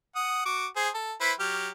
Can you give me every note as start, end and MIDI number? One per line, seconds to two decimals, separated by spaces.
0.16 0.44 78
0.16 0.44 87
0.45 0.66 66
0.45 0.66 86
0.76 0.89 68
0.76 0.89 72
0.95 1.13 69
1.21 1.32 64
1.21 1.32 71
1.21 1.32 72
1.40 1.69 54
1.40 1.69 67
1.40 1.69 89